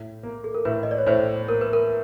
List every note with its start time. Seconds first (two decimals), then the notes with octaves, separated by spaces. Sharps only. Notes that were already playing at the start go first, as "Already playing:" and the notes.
Already playing: A2
0.23 A#3
0.44 A4
0.55 A#4
0.65 A2 B4
0.83 D#5
0.91 D5
0.98 C#5
1.07 A2 C5
1.48 A#3 A#4
1.61 B4
1.73 A#4